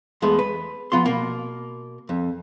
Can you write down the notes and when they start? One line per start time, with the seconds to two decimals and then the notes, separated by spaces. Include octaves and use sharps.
0.22 E2 G#3 A3 B3
0.39 B4
0.92 F3 B3 F4 C6
1.06 B2 A#3
2.09 F2